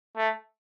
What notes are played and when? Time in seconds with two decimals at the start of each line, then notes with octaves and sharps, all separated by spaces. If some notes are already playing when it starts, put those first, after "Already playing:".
0.17 A3